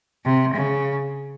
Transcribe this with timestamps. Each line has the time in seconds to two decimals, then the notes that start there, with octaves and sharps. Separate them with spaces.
0.25 C3
0.54 C#3